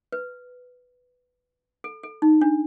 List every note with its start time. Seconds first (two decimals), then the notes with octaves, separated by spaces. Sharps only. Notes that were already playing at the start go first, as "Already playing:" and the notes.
0.12 B4
1.84 A4
2.03 A4
2.22 D#4
2.41 D4